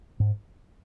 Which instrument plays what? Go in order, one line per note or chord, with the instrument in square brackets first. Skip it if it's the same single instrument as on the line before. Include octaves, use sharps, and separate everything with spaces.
[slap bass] G#2